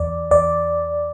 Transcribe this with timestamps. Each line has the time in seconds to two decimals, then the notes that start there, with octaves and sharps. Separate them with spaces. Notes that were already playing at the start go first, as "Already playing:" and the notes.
Already playing: E2 D5
0.31 E2 D5